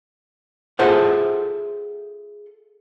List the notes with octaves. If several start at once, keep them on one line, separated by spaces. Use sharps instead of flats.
F4 G#4 A4 C5 E5 F#5